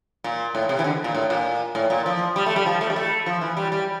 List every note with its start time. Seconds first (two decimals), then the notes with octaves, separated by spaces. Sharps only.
0.24 A#2
0.55 A2
0.69 C3
0.79 E3
0.84 D3
1.04 A#2
1.15 A2
1.30 A#2
1.75 A2
1.90 A#2
2.06 F3
2.36 G3
2.46 A3
2.56 G3
2.66 F3
2.81 A3
2.90 G3
2.96 A3
3.26 F3
3.41 E3
3.57 G3
3.72 G3